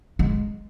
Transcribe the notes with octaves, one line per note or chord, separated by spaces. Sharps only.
G#3